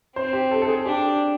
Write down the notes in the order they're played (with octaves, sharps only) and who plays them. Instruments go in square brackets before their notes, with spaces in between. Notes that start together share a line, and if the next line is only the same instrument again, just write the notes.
[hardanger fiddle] C4 [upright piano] C5
[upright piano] G4
A4
A4
G#4
[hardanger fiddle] D4 [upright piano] G4